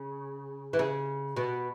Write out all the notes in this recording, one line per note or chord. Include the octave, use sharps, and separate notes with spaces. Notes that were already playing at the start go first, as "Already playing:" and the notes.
Already playing: C#3
E3
C#3
B2